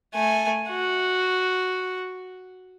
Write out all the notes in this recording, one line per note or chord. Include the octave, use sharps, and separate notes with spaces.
A3 G#5
F#4